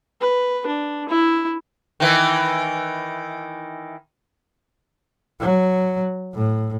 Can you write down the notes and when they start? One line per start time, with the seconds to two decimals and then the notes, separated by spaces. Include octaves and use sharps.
0.21 B4
0.66 D4
1.09 E4
2.00 D#3 E3
5.40 F#3
6.34 A2